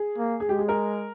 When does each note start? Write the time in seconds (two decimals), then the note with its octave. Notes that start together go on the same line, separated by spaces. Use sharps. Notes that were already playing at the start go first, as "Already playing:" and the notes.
Already playing: G#4
0.18 A#3
0.40 G#4
0.49 G#3 G4
0.59 G#4
0.68 A#4